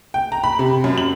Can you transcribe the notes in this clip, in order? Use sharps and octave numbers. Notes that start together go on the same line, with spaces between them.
G5
A#5
B5
C3
F#2
F#7